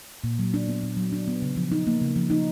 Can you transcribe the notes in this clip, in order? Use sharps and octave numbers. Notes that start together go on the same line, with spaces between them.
A#2
F#3
D4
B3
A#2
F#3
D4
B3
C#3
F3
D#4
A#3
C#3
F3
D#4